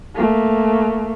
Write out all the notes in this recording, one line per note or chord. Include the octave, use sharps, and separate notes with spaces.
A3 A#3